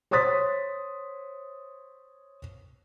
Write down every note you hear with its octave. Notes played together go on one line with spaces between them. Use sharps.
C5 C#5 C6 D#6 A6 B6